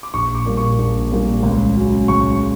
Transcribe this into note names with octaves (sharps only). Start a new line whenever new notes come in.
D6
A#1 C#6
D6
A#2 G3 A#3
C#6
A#1
A#2 G3 A#3
C#2
C#3 F#3
C#2 C#6